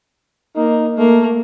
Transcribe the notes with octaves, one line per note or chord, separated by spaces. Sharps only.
A#3 D#4
A3 A#3